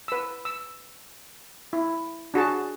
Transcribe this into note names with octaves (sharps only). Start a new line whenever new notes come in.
B4 E6
E6
E4
D4 F#4 G#4 A5